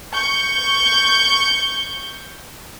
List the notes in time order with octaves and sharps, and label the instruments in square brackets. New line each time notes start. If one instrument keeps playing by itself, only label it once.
[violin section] C#6 G6